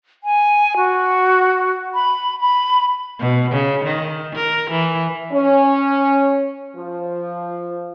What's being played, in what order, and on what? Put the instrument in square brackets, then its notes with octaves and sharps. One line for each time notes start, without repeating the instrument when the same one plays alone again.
[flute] G#5
F#4
B5
B5
[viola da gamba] B2
C#3
D#3
A#4
E3
[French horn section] C#4
F3